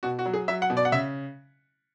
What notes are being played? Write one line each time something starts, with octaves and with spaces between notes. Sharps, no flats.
B2 F#4
F#4
F#3
G#4
F#3 E5
F#5
B2
D5
F#5
C#3 E5